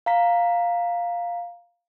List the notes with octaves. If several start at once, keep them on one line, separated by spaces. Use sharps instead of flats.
F5 A#5 B6